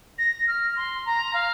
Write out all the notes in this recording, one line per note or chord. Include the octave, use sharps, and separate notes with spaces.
A#6
F6
C6
A#5
F5